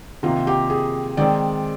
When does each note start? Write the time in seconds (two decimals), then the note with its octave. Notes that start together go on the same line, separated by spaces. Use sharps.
0.23 C3 D#3 A#3 F4
0.47 G4
0.70 G#4
1.17 D#3 G#3 C4 D5